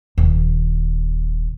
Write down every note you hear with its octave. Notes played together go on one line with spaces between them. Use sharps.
D#1